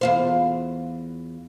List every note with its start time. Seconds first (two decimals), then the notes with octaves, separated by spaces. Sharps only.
0.01 E2 F4 C5